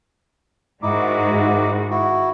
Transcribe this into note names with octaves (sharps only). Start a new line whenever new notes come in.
G#2 D#3 D#4 E4 F#4 D6
E4 F#4